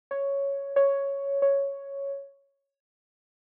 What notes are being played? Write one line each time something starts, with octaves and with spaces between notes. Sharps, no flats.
C#5
C#5
C#5